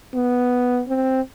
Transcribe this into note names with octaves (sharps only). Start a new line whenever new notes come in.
B3
C4